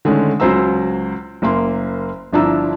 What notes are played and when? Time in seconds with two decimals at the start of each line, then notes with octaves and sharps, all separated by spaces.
0.05 D3 D#3 G#3 A3 C#4
0.40 C#2 F#3 C5 A#5 E6
1.42 F#1 A#3 C6
2.33 G1 F3 D4 E4 A#5 E6